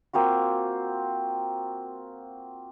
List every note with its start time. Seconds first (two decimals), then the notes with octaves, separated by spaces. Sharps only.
0.13 A#3 C4 F4 F#4